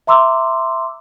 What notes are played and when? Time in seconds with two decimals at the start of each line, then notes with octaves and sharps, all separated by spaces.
0.07 E5 A#5 C6 D6 E6